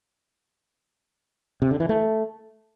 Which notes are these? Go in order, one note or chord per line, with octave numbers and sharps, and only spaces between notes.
C3
D3
E3
A3